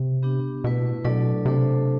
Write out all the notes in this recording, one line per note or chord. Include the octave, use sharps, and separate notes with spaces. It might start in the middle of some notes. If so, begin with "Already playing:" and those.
Already playing: C3
B3 D4 G4
B2 A3 E4 B4
B2 F#3 A3 D4 A4 D5
C3 A3 D4 A4 C5